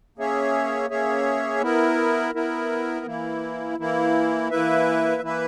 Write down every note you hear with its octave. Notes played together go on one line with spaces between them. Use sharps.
A#3 C#4 G#4 C#5 E5
A#3 C#4 G#4 C#5 E5
B3 E4 A#4
B3 E4 A#4
E3 A#3 E4
E3 A#3 E4
E3 A#3 E4 B4 E5
E3 A#3 E4 B4 E5